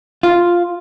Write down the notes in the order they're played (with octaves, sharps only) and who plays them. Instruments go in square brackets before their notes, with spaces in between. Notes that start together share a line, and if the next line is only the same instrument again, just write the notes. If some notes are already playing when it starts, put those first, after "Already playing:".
[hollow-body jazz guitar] F4